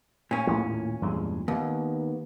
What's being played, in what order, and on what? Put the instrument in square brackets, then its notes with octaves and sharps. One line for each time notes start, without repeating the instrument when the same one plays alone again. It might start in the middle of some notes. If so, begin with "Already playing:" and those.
[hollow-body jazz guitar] A#2 C#4
[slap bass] D#2 A2
E2 G2 G#3
[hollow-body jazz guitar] D#2 [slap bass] A#3 B3